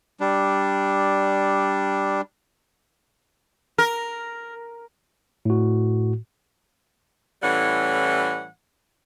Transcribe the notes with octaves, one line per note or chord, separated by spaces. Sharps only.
G3 D4
A#4
A2 F#4
A2 E3 G3 C#4 F#5